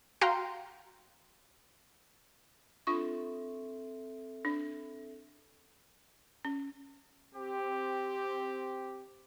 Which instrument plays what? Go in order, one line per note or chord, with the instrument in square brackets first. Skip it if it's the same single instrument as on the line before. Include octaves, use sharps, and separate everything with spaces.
[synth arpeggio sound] F#4 F5 G5 A#5 C6
[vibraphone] C4 A4 E5 [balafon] D4 F4 C#6
[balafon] D4
C#4
[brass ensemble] C4 G4